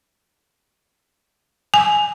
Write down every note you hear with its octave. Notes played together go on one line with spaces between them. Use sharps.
G#5